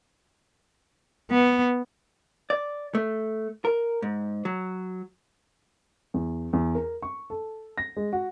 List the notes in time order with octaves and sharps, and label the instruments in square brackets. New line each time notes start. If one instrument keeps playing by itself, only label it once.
[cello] B3
[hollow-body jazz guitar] D5
A3
A#4
G#2
F#3
[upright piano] E2
E2
A#4
C#6
A4
A#6
G#3
F#4